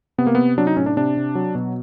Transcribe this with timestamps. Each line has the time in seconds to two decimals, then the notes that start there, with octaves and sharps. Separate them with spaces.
0.18 C3 B3
0.27 A#3
0.35 C3 B3
0.58 F#3 D4
0.67 D#4
0.77 A2 C#4
0.86 D4
0.97 C3 D4
1.17 C3
1.35 F#3
1.55 B2